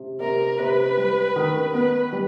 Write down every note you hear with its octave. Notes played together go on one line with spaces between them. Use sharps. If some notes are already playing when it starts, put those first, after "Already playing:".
Already playing: C3
C3 A#4
C3 B4
G3
D#3
B3 B4
G3